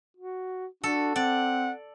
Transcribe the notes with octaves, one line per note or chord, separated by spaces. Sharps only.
F#4
D4 F#4 A4
C4 D5 F#5